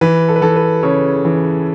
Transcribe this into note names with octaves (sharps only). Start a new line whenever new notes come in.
E3 B4
A4
B4
E3 A4
B4
C#3 C#5
E3